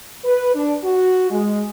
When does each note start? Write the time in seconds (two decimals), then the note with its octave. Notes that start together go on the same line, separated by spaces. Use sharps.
0.24 B4
0.54 D4
0.83 F#4
1.30 G#3